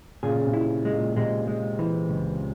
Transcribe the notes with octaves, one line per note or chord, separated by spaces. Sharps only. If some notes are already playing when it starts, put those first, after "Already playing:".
A#2 C#3 G#4
C#3
C3
E4
G#3
A#2
C3 G#3
G#3
E3
C#2